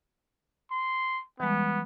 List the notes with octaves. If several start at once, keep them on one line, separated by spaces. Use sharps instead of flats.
C6
E3 G3 G#3 B3